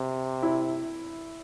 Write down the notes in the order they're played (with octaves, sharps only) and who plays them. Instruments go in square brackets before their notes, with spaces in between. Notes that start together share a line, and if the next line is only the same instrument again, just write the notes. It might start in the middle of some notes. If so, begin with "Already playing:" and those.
Already playing: [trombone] C3
[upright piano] E4